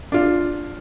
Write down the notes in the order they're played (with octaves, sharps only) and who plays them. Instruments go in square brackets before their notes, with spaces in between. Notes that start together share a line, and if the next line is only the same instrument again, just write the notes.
[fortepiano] D4 F4